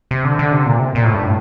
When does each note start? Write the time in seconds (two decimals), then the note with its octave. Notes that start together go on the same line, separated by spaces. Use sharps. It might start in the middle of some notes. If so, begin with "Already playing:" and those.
0.11 C3
0.25 D3
0.39 D3
0.53 C3
0.66 A#2
0.79 C3
0.95 A#2
1.04 A2
1.14 G2
1.23 A2